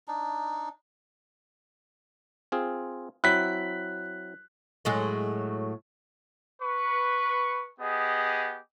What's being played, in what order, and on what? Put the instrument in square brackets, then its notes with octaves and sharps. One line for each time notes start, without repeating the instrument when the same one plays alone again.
[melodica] D4 D#4
[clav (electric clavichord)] C4 F4 G#4
[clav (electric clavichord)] F#3 C4 E4 [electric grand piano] F#6 B6
[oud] A2 F#3 G#3
[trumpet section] B4 C#6
B3 G4 G#4 D#5